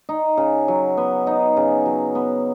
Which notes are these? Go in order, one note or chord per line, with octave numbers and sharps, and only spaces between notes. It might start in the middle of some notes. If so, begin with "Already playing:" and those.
D#4
C#3
F#3
B3
D#4
C#3
F#3
B3